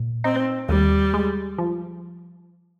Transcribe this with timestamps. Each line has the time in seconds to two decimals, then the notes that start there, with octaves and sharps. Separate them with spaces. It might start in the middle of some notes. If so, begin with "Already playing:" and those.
Already playing: A#2
0.24 C4 D#4
0.69 D#2 G3
1.14 G#3
1.58 F3